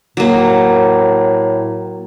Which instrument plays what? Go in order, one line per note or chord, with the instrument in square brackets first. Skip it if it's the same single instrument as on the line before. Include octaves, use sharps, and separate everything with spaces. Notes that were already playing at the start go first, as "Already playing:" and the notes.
[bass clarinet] A2 [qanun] F#3 A#3